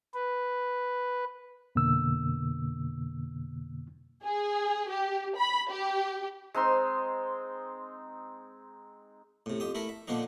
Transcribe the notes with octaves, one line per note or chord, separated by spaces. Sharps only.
B4
F2 B2 D3 A#3 E6
G#4
G4
B5
G4
G#3 C4 D#4 C6
A2 C3
F2 G4 D#6
A3 E4 A#4 E5
E5
A#2 D3 F3 A#3 D4 D#4